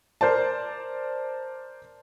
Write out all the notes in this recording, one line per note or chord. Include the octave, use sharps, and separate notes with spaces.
A#4 C5 D5 A5